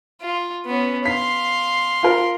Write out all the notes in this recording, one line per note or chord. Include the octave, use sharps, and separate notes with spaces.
F4
B3 C#4
F5 C6 B6
F4 A#4